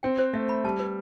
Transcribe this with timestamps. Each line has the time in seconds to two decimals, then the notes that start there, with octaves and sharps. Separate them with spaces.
0.03 C4 G5
0.18 C5
0.33 A3 E5
0.49 B5
0.64 G3 A5
0.79 B4